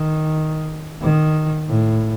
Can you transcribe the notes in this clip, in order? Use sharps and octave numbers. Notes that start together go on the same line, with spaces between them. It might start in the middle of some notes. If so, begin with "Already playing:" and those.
Already playing: D#3
D#3
A2